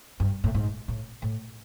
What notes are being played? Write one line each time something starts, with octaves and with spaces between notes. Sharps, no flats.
G2
A2
G#2
A2
A2